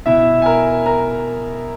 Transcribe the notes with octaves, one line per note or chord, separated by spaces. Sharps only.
B2 E4 E5
G#5
A#4 A#5
A#4 A#5